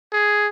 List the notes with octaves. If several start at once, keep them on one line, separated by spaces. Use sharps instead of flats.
G#4